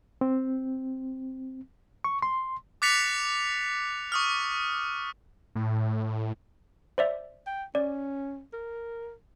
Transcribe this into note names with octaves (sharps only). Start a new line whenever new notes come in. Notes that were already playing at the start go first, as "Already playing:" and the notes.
C4
C#6
C6
D6 F#6 A6 B6 C#7 F7
C#6 D#6 F6
A2
C5 D5 E5
G5
C#4 D5
A#4